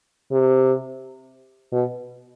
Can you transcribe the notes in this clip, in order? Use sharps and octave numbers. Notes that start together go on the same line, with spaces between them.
C3
B2